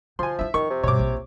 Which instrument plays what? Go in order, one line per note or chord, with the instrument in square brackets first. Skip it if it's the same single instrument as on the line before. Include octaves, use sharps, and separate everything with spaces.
[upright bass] D3 [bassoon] F3 [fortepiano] G#5 C6
[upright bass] D4 E4 [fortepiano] E5
[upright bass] F2 [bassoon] D#3 [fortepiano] C#6
[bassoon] C3
[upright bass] G2 B2 [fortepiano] C#5 D6
[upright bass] A#1